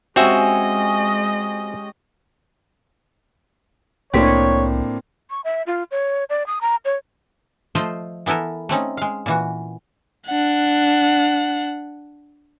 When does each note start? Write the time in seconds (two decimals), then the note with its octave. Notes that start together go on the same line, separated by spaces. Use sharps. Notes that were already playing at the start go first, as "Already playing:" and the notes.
0.16 G#3 C4 C#4 F#4 G4 D#5 E5 G#5
4.13 C2 A2 A#3 C4 D4 C#5 B6
5.30 C#6
5.44 E5
5.67 F4
5.91 C#5
6.30 D5
6.47 D#6
6.61 A#5
6.85 C#5
7.75 F3 A3 F4 C5 D#5
8.26 E3 B3 E4 A4 A#4
8.69 A3 C4 C#4 D#4
8.97 G#3 F5
9.26 A#2 E3 F#4
10.26 D4 F#5